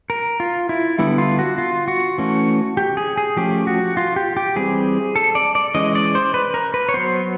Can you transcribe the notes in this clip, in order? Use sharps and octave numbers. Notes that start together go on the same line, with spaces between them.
A#4
F4
E4
D3 G3 B3 E4
F4
F#4
F4
F#4
E3 A3 C#4
G4
G#4
G#4
F3 A3 C#4 G4
F#4
F4
G4
G4
E3 G3 C4 G#4
A4
D5
D5
E3 G#3 C#4 D#5
D5
C5
B4
A#4
B4
C#5
F#3 B3 C5